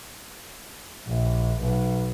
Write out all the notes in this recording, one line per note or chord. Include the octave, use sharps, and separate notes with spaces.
A#1
B1